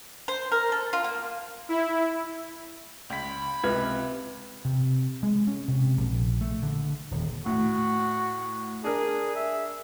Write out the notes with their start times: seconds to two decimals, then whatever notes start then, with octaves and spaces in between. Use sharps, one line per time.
0.28 C5
0.52 A#4
0.72 A4
0.93 F4
1.04 A#3
1.69 E4
3.10 C#2 B5 B6
3.64 C#2 C3 B4 F6 G#6
4.65 C3
5.23 G#3
5.47 C#4
5.68 C3
5.97 A#1
6.41 A3
6.63 D3
7.11 D#1
7.46 A2 F#4
8.84 D4 G#4 A#4
9.36 E5